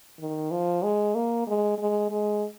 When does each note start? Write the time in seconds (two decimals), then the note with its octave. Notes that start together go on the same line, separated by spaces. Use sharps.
0.19 D#3
0.51 F3
0.83 G#3
1.15 A#3
1.47 G#3
1.78 G#3
2.10 G#3